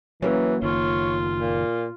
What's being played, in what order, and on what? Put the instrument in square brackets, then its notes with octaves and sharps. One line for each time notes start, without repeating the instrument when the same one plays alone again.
[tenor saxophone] E3 [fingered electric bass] F#3 [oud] A#3 C#4
[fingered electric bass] F#1 D#3 [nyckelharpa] F4 [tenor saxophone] C#5
[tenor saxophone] A#2